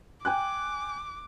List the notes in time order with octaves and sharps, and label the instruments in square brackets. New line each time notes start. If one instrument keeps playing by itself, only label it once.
[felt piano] G5 G#5 F#6 [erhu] D6